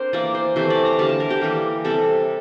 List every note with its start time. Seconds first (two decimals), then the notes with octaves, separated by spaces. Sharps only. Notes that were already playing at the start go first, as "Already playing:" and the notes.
Already playing: C4 D4 A#4 C5
0.13 E3 A#3 D5
0.35 C5
0.56 C3 E3 A3 C5
0.70 D5
0.85 A#5
0.99 D3 G3 A#3 A5
1.09 A5
1.20 A#4
1.30 G4
1.41 E3 G3 A#3
1.85 C3 G3 A4